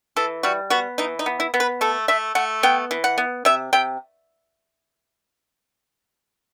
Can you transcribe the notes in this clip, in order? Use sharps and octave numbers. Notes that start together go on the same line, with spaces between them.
E3 A4
G3 F#4
B3 F#4
E3 D#4
D#4
B3
E4
B3
B4
A3 A4
A3 E5
A3 F#5
B3 G5
E3
F#5
B3
C3 E5
C3 G5